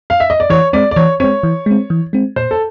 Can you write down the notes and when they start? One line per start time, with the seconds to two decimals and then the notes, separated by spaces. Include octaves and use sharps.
0.10 F5
0.20 E5
0.30 D#5
0.40 D5
0.50 E3 C#5
0.73 G#3 C4 D5
0.91 D5
0.96 E3 C#5
1.20 G#3 C4 C#5
1.43 E3
1.66 G#3 C4
1.90 E3
2.13 G#3 C4
2.36 A#2 C5
2.51 A4